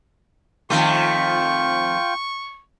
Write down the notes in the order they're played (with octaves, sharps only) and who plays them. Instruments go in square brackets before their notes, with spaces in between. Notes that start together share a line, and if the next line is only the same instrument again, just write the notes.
[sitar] F2 D#3 A3 [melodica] F4 G5 [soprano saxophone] C#6